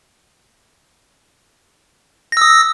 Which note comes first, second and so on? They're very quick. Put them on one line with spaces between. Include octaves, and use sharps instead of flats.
A#6 E6 D#6